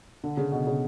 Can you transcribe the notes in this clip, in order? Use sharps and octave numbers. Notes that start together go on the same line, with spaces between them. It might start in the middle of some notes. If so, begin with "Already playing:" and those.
D3
C#3
B2
C#3